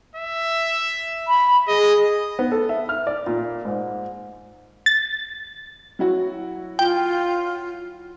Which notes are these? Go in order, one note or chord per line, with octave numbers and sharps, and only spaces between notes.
E5
B5
G#4 D#5
B3
A4
E5
F6
D5
A#2
G#2
A6
F#3 E4 F#4
F4 G5